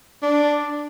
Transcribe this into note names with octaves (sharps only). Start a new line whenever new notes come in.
D4